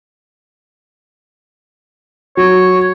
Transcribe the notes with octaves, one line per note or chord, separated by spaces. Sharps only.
F#3 C#5